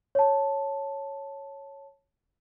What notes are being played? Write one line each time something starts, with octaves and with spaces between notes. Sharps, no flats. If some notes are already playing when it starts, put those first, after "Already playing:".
C#5 A5